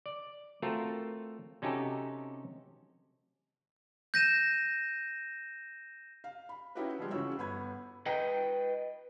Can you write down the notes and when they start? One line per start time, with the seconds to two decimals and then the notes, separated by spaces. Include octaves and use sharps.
0.06 D5
0.62 A3 C4 F4 F#4 A4 A#4
1.62 C3 C#4 D#4 F#4 G4 A4
4.14 G6 A#6 D#7 E7
6.24 F5
6.49 B5
6.75 C#4 D#4 E4 F#4 G4 B4
6.99 F3 G3 G#3
7.11 C#3 E3 F4 F#4 C#5 E6
7.38 G1 B3 B5 G#6
8.06 B4 D#5 G5